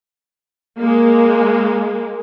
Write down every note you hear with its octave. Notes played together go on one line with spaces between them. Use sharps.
G#3 A#3